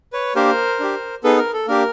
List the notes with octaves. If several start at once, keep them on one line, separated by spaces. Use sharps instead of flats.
B4 C#5
A#3 D4 G4 A#4 C5
D4 G4
B3 D#4 G#4 A4 B4
A#4
A4
A#3 D4 G4 A#4